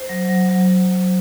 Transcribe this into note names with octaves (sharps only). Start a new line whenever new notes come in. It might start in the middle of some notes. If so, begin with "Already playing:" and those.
Already playing: C5
F#3
F#3
F#3